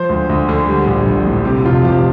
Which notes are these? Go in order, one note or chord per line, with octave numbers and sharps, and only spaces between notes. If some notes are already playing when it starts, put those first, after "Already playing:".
Already playing: F3 C5
D2
D2
D3
G3
A#1
A#1
A2
C3 G4
F1 F4
F3 G4